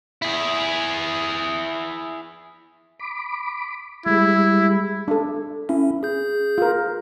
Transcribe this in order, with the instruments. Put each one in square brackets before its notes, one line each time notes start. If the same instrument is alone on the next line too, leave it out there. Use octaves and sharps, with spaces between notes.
[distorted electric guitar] E4 G#4
[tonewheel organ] B5 D6
[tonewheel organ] G3 G#3 [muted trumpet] E4
[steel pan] D4 A4
[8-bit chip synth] C#4 [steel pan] E4
[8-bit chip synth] G#4 G6
[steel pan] F4 A#4